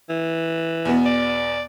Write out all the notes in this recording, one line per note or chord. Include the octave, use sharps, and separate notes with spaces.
E3
E2 B2 B3
D5